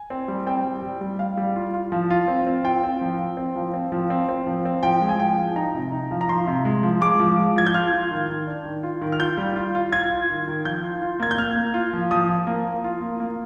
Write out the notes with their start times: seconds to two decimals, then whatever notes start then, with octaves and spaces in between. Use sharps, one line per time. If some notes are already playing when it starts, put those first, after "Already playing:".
Already playing: G#5
0.10 C4
0.28 G3
0.47 C4 G5
0.65 G3
0.83 G3
1.01 G3
1.19 G3 F5
1.37 G3
1.56 F4
1.74 F4
1.92 F3
2.10 F4
2.28 C4
2.47 C4
2.65 F4 G5
2.83 C4
3.01 F3
3.19 F3
3.37 C4
3.56 F3
3.74 C4
3.92 F3
4.10 C4
4.29 C4
4.47 F3
4.65 C4
4.83 F3 G5
5.01 G#3
5.09 G#5
5.19 F3 G5
5.38 F3
5.56 D#4 A#5
5.74 C3
5.92 D#4
6.11 F3
6.21 A#5
6.28 F3 C6
6.47 C3
6.65 G#3
6.83 F3
7.01 G#3 D6
7.20 F3
7.38 G#3
7.56 F3 G#6
7.66 G6
7.74 F4 F6
7.92 F4
8.11 D#3
8.29 D#3
8.47 D4
8.66 D#3
8.83 F4
9.02 D#3
9.12 F6
9.20 F4 G6
9.37 G3
9.56 F4
9.75 F4
9.92 F4 G#6
10.11 F4
10.29 D#3
10.48 D#3
10.65 F3 G6
10.84 F4
11.02 F4
11.20 A#3 G#6
11.31 G6
11.38 A#3 F6
11.56 A#3
11.74 F4
11.93 F3
12.11 F3 D#6
12.29 F3
12.47 A#3
12.66 A#3
12.84 F4
13.02 A#3
13.20 A#3